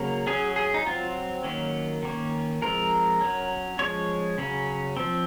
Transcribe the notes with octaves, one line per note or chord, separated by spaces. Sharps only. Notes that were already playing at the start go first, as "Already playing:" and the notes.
Already playing: C#3 F#3 A#3
F#3 C#4 G#4
G#4
D#4
F#3 C4 F4
D#3 F#3 A#3 C#4
D#3 A#3 C#4
F3 G#3 C4 A#4
F#3 C#4
F3 G#3 C#4 C#5
C#3 F#3 C#4
F3 C4